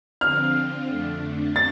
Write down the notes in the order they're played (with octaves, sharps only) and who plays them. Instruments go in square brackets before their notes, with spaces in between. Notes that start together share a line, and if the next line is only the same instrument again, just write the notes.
[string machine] D3 F3 C4 F4 [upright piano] F6
[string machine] F2 D3 A3 D4
[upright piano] A6